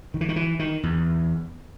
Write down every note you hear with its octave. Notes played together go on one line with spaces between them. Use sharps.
D#3
E3
D#3
E3
D#3
E2